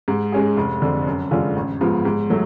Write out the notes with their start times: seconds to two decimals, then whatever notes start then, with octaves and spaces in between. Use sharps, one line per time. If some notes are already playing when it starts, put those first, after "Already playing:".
0.08 G#2
0.32 G#3 C#4 G#4
0.57 F1
0.82 F2 D3
1.07 F#2
1.31 D3 G#3 C#4 F4
1.56 A1
1.81 G#2 F3 B3
2.05 G#2
2.30 F#3 A3